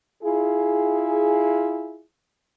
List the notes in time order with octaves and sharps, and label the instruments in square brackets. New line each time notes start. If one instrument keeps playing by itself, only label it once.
[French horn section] E4 F4 G#4